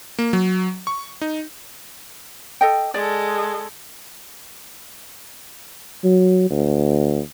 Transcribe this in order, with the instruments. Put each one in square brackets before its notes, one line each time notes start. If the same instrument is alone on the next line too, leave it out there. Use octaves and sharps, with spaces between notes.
[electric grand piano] A#3
F#3
C#6
D#4
[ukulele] A4 D#5 G5
[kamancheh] G#3 A4 [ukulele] D5
[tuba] F#3
D2